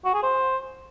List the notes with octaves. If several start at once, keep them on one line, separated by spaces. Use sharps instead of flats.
F#4
G#4
C5